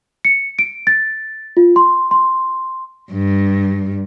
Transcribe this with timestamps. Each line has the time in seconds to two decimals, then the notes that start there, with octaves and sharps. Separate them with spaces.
0.25 C#7
0.59 D7
0.87 A6
1.57 F4
1.76 C6
2.11 C6
3.11 G2